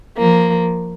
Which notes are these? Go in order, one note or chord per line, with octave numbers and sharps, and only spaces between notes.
F3 A#3